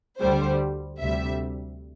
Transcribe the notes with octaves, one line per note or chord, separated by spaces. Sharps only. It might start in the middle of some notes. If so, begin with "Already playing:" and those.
D2 D3 G3 C5
D2 C3 G3 E5